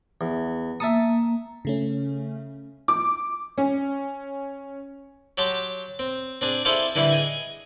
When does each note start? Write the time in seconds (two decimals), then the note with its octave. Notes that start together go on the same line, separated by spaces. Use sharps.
0.21 E2
0.80 A#3 E5 A5 D#6
1.65 C#3 A3 C#4
2.88 D6
3.58 C#4
5.38 F#3 G4 A5 C6
5.99 C4
6.41 C4 D4 G#4
6.65 E4 G#4 A4 C5 D5 F5
6.95 D3 E3 G3 E4
7.10 G#4 D#5 G#5